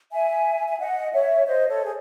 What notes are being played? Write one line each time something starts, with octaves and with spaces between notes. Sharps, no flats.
E5 G#5
G#5
D#5 F#5
C#5 E5
C5 D#5
A4 C#5
G#4